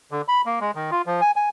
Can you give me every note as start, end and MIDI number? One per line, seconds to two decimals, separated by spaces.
0.11 0.22 50
0.28 0.42 83
0.46 0.59 58
0.60 0.71 56
0.75 0.91 51
0.91 1.02 65
1.06 1.21 53
1.21 1.31 80
1.36 1.49 80